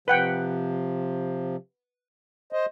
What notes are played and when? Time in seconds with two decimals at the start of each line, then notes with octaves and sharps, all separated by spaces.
0.08 C3 F3 B4 F#5 G5
2.53 C5 D#5